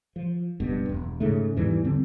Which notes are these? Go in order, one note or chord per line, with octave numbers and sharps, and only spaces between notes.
F3
F#1 G2 B2
E1
G#2 C#3 A3
E2 G#2 E3 G3
D3 G3 C4